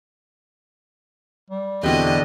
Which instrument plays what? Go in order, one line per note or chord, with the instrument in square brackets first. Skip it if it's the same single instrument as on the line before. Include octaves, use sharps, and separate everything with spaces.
[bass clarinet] G3
[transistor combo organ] E2 G4 [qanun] B2 D3 F#4 [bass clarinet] C4 [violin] D#5